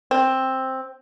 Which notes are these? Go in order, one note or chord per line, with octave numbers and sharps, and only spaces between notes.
C4